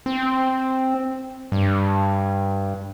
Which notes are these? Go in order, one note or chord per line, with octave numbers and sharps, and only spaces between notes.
C4
G2